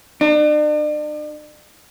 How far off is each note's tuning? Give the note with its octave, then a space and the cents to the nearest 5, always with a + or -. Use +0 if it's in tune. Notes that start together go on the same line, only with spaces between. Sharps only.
D4 +40